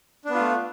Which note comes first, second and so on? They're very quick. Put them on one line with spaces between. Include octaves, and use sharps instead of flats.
D4 B3 F4 A3